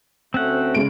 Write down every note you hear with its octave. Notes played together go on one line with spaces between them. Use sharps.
D2 A3 C4 C#4 F#5
C#3 G#3 D7